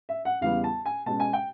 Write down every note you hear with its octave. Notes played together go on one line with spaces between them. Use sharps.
E5
F#5
E2 C#3 E3 G3 B3 F5
A5
G#5
B2 G#3 C#4 A5
G#5
G5